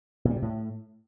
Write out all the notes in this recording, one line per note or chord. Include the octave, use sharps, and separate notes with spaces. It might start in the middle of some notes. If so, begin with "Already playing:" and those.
A#2
G3
C3
A2